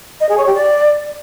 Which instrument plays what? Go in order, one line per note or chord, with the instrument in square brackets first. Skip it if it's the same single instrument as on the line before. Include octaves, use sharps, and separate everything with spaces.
[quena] D#5
G#4
C#5
G4
D5